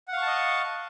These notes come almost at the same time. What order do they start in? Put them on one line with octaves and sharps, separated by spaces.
F#5 F5 C#6 A5 D#5